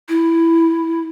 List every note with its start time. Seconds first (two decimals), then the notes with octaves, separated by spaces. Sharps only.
0.09 E4